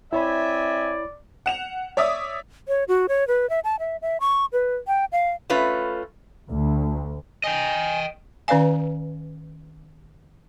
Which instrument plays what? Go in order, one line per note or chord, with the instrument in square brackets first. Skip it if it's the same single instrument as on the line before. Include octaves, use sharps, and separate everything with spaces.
[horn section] C4 E5 G#5 [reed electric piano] E4 C#5 B5 [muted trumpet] D5
[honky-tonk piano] F#5 E7 F7
C#5 D5 E5 D6 D#6
[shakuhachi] C#5
F#4
C#5
B4
E5
A5
E5
E5
C#6
B4
G5
F5
[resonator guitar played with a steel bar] A3 C#4 F4 B4
[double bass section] D2
[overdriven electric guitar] D#5 G5 [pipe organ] G#5
[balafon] D#3 C#4 B4 D5 F5 G#5